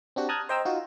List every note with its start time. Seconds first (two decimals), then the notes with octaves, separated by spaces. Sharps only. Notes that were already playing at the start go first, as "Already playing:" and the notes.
0.16 C4 D4 F#4 G4
0.29 A5 A#5 D#6 F6 F#6 G#6
0.49 C5 D#5 G5 A#5 E6
0.65 D#4 F4 F#4